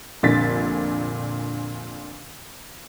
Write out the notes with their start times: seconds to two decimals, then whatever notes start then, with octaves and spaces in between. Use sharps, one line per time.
0.23 F1 A#1 A#2 D3 A6 B6